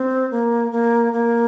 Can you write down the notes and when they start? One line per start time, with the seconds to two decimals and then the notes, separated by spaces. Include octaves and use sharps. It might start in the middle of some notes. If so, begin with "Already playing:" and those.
Already playing: C4
0.31 A#3
0.72 A#3
1.13 A#3